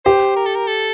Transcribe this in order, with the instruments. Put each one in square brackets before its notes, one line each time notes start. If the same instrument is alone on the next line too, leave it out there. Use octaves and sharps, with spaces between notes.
[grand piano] G4 [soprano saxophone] C5
[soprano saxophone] A#4
A4
A#4
A4